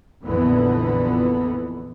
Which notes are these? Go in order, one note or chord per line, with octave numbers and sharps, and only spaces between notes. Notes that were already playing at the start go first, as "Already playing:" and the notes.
A#1 F2 D3 E3 B3